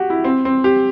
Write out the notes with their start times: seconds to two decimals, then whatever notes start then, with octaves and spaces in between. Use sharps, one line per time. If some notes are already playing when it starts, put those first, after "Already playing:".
Already playing: F#4 G4
0.10 E4
0.24 C4
0.45 C4
0.64 G4